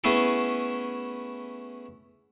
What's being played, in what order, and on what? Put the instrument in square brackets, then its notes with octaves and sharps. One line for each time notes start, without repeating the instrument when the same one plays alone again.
[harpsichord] A3 B3 C#4 E4 G#4 A4